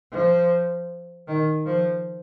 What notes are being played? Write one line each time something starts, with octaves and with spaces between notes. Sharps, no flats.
F3
D#3
F3